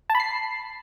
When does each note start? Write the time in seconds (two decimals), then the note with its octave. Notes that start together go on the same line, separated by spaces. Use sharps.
0.10 A5
0.15 B5
0.20 C7